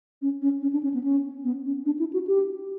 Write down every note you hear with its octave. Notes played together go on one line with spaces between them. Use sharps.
C#4
C#4
C#4
D4
C#4
B3
C#4
B3
C#4
D4
E4
F#4
G4